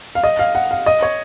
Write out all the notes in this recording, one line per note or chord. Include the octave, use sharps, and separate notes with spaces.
F5
D#5
F5
F#5
F5
D#5
C#5